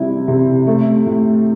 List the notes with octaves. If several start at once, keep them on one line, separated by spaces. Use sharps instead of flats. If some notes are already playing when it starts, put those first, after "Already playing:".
Already playing: C3 G3 E4
C3
A3
A2